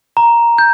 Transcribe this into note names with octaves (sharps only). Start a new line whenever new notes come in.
A#5
G6